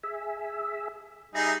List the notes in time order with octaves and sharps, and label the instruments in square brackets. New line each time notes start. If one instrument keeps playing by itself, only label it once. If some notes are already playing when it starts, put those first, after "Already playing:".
[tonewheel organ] G#4 E5
[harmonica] G3 D#4 G#4 [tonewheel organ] E5 A#5